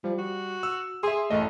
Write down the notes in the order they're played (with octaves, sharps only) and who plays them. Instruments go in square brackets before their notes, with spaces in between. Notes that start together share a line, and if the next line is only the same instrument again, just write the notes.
[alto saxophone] F3 [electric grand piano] G3
[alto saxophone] F#4
[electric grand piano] E6
[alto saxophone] G#4 [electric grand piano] E5 C6
[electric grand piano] A1 F#2 D#5 [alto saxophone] A3